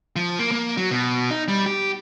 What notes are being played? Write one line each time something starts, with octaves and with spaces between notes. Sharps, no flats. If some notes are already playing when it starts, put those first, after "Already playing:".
F3
A#3
A#3
F#3
B2
D#4
G3
G4